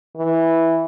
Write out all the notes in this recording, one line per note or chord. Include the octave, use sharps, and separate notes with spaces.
E3